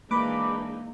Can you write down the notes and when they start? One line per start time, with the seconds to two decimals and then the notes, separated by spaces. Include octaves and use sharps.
0.11 E3 G#3 A#3 D4 D#4 B4 D6